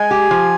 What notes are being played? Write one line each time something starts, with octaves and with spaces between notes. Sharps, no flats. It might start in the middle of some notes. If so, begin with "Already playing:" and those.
Already playing: G#3 G#5
G4
F3